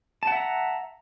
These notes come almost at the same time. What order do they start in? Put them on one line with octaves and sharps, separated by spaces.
A5 F#5 E5 A#5